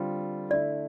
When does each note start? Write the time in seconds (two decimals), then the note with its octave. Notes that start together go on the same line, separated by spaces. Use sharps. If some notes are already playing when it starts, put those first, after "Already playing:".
Already playing: D3 G3 C4 F4
0.50 D3 A3 E4 D5